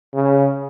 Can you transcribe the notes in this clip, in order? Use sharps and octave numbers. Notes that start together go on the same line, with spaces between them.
C#3